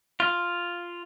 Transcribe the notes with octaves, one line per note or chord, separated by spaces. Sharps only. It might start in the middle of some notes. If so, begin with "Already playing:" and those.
F4